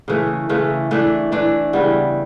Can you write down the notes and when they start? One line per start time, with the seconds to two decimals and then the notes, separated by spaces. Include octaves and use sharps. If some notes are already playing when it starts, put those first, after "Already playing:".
0.08 C#3 E3 A3
0.49 C#3 E3 A3
0.91 E3 A3 D4
1.32 E3 A3 D4
1.73 C#3 E3 G3 B3